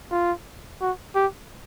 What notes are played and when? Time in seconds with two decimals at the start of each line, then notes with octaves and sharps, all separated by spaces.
0.11 F4
0.81 F#4
1.15 G4